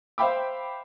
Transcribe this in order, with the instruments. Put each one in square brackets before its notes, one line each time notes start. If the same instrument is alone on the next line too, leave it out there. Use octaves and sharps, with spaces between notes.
[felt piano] C5 E5 F5 G5 B5 D6